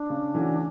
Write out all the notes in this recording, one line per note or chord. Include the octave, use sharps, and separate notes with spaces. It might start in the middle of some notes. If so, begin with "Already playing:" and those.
Already playing: D4
C#3
E3 A3 C#4 F#4